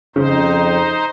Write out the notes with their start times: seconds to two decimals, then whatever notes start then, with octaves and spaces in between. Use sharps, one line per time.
0.16 F2 C#3 D#4 C5